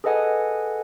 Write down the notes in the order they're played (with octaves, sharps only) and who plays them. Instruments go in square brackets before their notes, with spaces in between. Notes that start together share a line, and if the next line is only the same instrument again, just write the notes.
[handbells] G#4 A4 B4 D#5 F#5 G#5